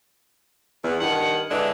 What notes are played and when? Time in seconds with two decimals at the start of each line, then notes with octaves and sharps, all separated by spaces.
0.84 E2
1.00 G2 D#3 F#5
1.51 D3 E3 G#3 D4